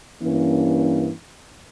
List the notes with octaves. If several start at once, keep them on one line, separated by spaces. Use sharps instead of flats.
G2 E3 A#3 C#4